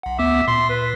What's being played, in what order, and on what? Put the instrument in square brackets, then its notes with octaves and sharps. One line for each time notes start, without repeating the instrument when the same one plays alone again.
[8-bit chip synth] B1 F#5
[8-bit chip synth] D2 B3 D6 [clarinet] E5
[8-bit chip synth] A#2 [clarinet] C6
[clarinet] B4